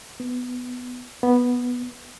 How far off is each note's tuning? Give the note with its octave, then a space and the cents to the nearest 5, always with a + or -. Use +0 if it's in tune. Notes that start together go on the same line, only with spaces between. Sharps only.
B3 +10
B3 -5